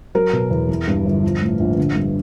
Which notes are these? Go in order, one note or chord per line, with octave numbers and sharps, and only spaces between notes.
F#3 A#4
B2
E2
E3
G2
G1
F3
A2
A#1
D3
G2